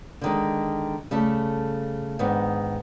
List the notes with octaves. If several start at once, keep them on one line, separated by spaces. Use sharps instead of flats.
D3 D#3 G#3
C#3 G3 A3 A4
G#2 D#3 B3 D4